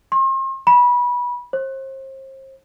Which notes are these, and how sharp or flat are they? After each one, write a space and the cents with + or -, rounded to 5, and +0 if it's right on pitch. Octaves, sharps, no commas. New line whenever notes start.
C6 +40
B5 -20
C5 +35